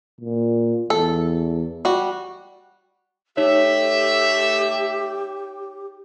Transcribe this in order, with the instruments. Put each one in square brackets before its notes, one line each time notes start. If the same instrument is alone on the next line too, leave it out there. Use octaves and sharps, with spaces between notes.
[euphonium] A#2
[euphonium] E2 [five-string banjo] A4
[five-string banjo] G3 F#4
[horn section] A3 E5 [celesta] D#4 C#5 [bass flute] G4